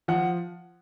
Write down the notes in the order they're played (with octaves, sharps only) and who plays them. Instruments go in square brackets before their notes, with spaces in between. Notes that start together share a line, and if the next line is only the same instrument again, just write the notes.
[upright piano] F3 F#5